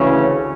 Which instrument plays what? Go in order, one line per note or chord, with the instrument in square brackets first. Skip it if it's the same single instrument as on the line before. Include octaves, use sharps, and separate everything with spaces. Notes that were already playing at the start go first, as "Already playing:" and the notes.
Already playing: [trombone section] D2 C#3 E3 C#4